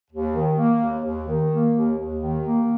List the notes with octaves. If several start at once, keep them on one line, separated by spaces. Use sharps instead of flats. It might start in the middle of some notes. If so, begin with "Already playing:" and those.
D#2
D#3
A#3
D#2
D#2
D#3
A#3
D#2
D#2
D#3
A#3